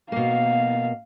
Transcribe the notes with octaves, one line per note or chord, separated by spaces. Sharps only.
B2 A#3 F5